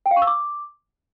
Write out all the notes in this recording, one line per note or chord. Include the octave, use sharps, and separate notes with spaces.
G5
F5
C#6
E6
D6